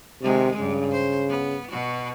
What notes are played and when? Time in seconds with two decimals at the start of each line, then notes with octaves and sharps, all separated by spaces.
0.23 C3 D#3 G#3
0.58 G2 C#3
0.92 C5
1.29 B3
1.71 B2 F#4